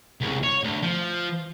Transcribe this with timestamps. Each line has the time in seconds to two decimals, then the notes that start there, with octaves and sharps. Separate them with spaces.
0.21 C2 C#3
0.44 C#5
0.64 D2
0.83 F3